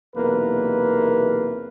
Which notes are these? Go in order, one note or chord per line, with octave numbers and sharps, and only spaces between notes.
B1 E2 C3 A#3 B4